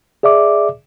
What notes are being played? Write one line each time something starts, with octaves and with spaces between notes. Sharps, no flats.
G#4 D5 E5 D6